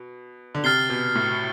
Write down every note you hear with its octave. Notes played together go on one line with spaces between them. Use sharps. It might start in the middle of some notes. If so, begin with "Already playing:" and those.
Already playing: B2
D3
C3 F6 A6 C7 G7
B2
A2